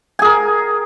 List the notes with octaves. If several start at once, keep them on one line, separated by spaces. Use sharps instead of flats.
G#4 A#4 G#5